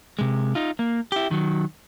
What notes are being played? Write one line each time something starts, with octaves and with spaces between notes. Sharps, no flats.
C3 G#3
D#4 F4
A#3
E4 G4
D#3 F#3